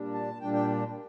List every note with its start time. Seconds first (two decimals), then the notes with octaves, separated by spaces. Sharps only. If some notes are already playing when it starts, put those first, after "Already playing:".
Already playing: A#2 G3 D4
0.14 A5
0.41 A#2 G3 D4 G5
0.54 G5